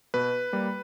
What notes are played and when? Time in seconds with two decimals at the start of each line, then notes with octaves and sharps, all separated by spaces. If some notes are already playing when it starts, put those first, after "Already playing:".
0.14 B2 B4
0.53 G3 A#3